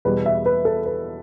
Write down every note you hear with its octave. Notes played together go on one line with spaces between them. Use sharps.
E2 B2 G3 B4
E5
B4
A4
B4